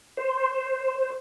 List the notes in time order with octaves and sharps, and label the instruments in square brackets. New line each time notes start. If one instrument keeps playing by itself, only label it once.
[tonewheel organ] C5